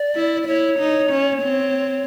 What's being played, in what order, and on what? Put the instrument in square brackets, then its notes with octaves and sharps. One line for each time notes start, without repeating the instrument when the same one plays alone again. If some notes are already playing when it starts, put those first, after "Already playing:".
Already playing: [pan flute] D5
[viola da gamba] E4
[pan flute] D5
[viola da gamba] E4 [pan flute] C#5
[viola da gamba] D#4
C#4
C4